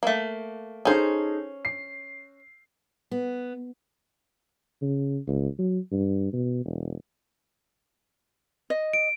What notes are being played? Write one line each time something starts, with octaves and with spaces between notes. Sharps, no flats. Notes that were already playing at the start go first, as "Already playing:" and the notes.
A3 A#3
C#4 D#4 G#4 A4 C5
C7
B3
C#3
C#2
F#3
G2
B2
E1
D#5
D7